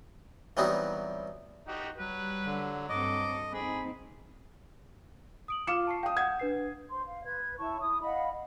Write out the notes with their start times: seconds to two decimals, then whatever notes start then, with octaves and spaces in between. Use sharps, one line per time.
0.57 E3 F#3 G3 B3 C4 D#4
1.68 D#4 F#4 G4
1.98 F#3 G3 B4
2.46 D3
2.89 G2 C4 A4 D#5 D6
3.53 C4 D#4 G#4 B5
5.48 D#6 D7 F#7
5.67 F4 D6 F6 C#7 E7
5.87 A5 C#6 C7
6.03 F5 G5 D#6
6.17 F#5 G6 G#6
6.39 D4 B4 C7
6.90 C5 C6
7.05 F5
7.24 B4 G#6
7.58 E4 C#5 A5 C#6
7.80 E4 D#6
8.02 D#5 F5 F#5 B5